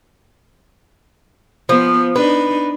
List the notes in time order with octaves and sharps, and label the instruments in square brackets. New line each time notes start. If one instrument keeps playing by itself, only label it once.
[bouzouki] F3 [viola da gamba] B3
[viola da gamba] D4 D#4 [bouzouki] B4